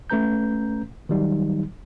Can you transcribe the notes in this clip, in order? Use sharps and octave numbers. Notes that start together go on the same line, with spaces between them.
A3 C#4 B4 A#5 G6
D#3 F#3 G3 D#4